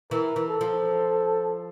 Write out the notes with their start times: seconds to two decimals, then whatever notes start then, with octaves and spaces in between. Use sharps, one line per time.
0.11 E3 A#4
0.36 E3
0.48 A4
0.61 F3